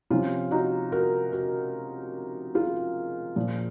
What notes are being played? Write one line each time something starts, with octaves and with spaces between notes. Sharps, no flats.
C3 F3 C#4 F4
D#4 F#4
F#4 A#4
F#4 A#4
F4 G#4
A#2 F3